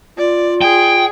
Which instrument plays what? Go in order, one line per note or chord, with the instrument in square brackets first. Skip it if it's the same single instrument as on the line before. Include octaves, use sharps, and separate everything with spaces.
[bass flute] F4 [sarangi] D5
[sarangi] G#4 [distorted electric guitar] G5